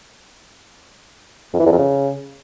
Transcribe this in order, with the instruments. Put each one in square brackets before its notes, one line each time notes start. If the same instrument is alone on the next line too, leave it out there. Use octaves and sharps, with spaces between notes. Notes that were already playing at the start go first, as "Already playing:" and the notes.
[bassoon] F2
E3
E2
F2
C#3